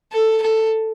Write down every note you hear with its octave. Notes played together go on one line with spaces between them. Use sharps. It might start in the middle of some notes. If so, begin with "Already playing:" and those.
A4
A4